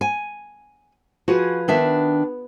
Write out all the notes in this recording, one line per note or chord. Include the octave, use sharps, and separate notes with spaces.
G#5
F3 F#4 G#4 B4
D#3 B3 D4 E5